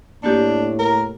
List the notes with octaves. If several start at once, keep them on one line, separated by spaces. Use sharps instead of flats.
A2 A#3 D4 G4
A#4